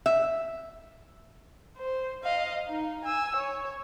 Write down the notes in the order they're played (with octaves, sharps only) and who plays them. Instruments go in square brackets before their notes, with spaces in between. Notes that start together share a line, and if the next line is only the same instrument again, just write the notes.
[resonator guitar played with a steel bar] E5
[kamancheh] C5
D#5 F5
D#4
G#5 E6
C#5